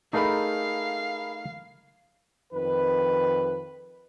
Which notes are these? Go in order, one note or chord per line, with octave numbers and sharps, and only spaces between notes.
A3 D#4 G#4 A#4 F5 B5
F2 D#3 B4